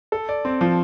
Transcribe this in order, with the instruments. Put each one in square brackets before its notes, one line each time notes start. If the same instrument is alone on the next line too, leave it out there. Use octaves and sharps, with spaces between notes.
[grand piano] A4
D5
C4
F3